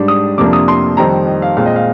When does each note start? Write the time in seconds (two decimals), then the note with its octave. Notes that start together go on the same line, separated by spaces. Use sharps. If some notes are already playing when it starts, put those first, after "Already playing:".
Already playing: G#2 G3 D4
0.08 D#6
0.38 F2 C3 F3 A#3 D4 D6
0.53 D#6
0.68 C6
0.97 F2 D#3 G3 C4 D#4 A#5
1.27 D#5
1.42 F5
1.57 A#2 G#3 C4 F5
1.66 D#5
1.76 F5